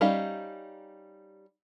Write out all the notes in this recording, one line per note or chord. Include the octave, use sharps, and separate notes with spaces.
G3 C#4 D#4 G4 F5